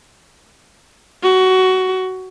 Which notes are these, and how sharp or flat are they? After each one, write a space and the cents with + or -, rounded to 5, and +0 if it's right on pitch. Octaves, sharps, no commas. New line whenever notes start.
F#4 +15